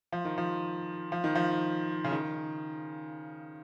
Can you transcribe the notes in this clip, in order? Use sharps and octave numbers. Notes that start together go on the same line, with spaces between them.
F3
D#3
F3
F3
D#3
F3
C#3
D#3